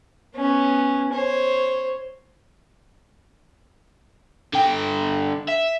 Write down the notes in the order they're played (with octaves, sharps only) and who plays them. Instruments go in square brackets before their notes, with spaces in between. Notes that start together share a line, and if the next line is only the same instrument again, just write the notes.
[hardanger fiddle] B3 C#4
C5 C#5
[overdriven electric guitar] D3 G5
E5